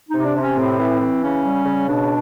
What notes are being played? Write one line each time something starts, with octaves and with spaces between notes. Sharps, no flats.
C3 D#4
D4
C3
C#4
A2 C4
E3
E3
C#3 C#4
G3
C#3
B2 D4